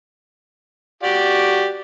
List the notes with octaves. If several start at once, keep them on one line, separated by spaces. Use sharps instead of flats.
F#4 G4 D5